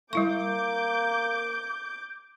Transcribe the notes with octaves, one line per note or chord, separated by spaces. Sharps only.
G3 A#3 E4 C#6 D6 G6